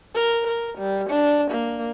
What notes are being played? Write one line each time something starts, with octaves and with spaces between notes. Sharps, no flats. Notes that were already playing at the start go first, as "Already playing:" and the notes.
A#4
A#4
G3
D4
A#3